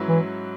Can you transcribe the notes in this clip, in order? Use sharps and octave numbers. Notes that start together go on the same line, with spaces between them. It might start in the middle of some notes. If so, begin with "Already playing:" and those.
Already playing: G#2 F#3 C#4 E4 B4
E3